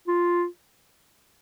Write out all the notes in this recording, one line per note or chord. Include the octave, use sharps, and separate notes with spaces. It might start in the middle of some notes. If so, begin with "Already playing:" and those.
F4